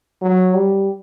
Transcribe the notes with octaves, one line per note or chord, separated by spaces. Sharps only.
F#3
G3